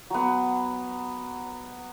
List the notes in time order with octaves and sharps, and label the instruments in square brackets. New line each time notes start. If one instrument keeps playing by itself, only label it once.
[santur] F#3 B3